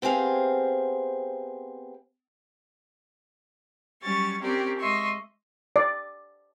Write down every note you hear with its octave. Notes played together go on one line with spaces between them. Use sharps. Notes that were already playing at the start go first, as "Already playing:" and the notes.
B3 C4 G4 G#4 F5
F#3 G3 C#4 C#6 A6
C4 C#4 G4 A#4 D5
G#3 D#5 E5 C6 C#6
D5